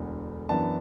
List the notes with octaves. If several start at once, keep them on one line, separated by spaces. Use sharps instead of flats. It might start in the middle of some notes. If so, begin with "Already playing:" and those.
Already playing: E1 D2 D3
F#2 E3 B3 D4 A5